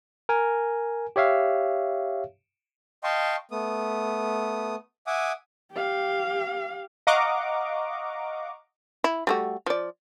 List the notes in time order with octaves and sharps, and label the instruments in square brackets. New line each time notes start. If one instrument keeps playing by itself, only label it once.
[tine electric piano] A#4 G#5
G4 C#5 E5 F5
[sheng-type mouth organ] D#5 F5 G5 A5 C6 C#6
A3 B3 D#6
E5 F#5 G#5 D6 D#6
[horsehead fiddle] G4 F5
[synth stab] D#5 F5 F#5 A#5 C#6 D6
[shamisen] E4
G3 A3 F#4
F3 D5